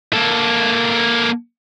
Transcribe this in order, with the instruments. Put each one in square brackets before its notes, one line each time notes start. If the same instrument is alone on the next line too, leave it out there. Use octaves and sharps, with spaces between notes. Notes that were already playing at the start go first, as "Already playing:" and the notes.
[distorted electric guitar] A#3 A4